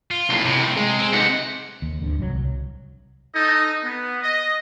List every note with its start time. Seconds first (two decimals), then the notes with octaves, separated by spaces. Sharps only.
0.11 F4
0.29 B1 A2
0.45 C3
0.77 G#3
0.99 C4
1.13 C3 D#4 F#5
1.82 D#2
2.02 D1 D2 D3
2.18 D1 C2 D3 F#3
2.33 C2
3.34 D#4 A4 D#5
3.83 B3
4.22 D#5